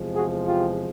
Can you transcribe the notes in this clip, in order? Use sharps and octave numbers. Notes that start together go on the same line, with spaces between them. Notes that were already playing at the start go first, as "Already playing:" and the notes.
Already playing: E2 C3 F3 G#3
F#4 G#4
F4 G4